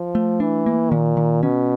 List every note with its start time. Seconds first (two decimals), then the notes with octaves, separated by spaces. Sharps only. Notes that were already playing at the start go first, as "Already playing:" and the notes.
Already playing: F3
0.15 A3
0.40 E3 D4
0.66 A#3
0.91 A#2 D#3
1.17 D#3
1.42 B2 C#4